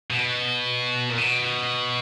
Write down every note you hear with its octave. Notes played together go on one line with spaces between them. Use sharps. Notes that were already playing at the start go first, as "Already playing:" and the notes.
B2
A#2
B2